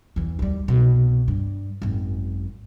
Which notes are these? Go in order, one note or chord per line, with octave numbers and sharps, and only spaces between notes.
E2 E3
D#2 G3
C2 B2
G2
G#1 F#2